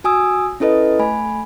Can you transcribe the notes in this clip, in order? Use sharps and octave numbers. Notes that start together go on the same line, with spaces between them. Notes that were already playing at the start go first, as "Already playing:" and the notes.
F#4 G#5 D#6 E6
C#4 E4 A4 B4 D#5
A3 G#5 B5